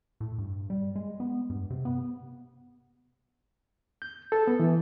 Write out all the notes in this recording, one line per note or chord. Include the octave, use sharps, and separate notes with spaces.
A2
G2
G3
G#3
B3
G2
C3
B3
G6
A4
B3
E3